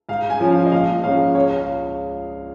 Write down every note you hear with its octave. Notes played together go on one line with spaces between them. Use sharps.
G#2 F5
G#5
F3 C#4
F5
D#5
A#1 F5
G#2 F3 G#3 C#4 F5
C#2 C#5
F5